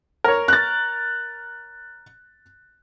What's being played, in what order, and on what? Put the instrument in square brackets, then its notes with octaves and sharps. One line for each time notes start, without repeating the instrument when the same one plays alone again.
[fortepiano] A#4 C#5
[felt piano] F#6 A6